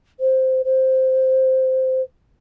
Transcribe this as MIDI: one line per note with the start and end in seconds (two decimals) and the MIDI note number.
0.19 0.62 72
0.64 2.01 72